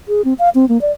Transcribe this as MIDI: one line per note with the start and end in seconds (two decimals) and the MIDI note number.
0.08 0.24 68
0.25 0.33 60
0.39 0.49 77
0.55 0.68 60
0.69 0.80 58
0.81 0.92 74